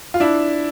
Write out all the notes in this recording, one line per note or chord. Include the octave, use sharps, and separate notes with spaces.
F4
D4 E4